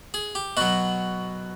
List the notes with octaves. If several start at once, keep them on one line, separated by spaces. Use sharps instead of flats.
G#4
G4
B2 F#3 F#4